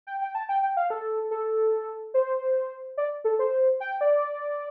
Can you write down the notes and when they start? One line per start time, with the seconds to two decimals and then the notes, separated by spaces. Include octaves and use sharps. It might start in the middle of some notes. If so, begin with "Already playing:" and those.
0.07 G5
0.21 G5
0.35 A5
0.49 G5
0.62 G5
0.77 F5
0.90 A4
1.31 A4
2.14 C5
2.98 D5
3.24 A4
3.39 C5
3.80 G5
4.01 D5